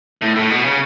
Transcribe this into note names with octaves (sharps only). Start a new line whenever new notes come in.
A2
A2
B2
C#3